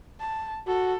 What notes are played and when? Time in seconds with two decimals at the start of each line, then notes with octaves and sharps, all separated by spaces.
0.20 A5
0.67 F#4 A4